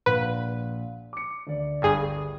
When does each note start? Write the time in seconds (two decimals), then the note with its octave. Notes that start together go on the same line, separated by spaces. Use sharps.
0.06 A#1 A#2 B4 F#5
1.13 D6 C#7
1.47 D2 D5
1.82 G1 G2 G#4